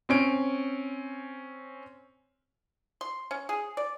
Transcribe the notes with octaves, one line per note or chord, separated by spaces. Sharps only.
C4 C#4 D7
C6
C#4
G#4
D5